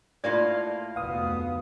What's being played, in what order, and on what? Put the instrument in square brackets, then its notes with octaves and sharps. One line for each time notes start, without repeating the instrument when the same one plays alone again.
[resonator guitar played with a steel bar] A2 A#3 F4 [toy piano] D5
[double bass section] F1 D2 B3 [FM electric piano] F5 D#6